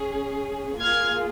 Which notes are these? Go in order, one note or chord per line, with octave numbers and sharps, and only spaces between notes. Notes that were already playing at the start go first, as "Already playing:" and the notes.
Already playing: C#4 G#4
A#3 F4 G#4 F6 G#6